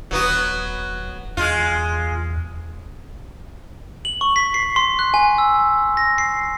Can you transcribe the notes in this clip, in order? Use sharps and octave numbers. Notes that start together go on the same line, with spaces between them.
D#1 F#3 B3 F#4
E2 G#3 F4
F#7
C#6
B6
C7
C6
F#6
G#5
E6
A#6
C7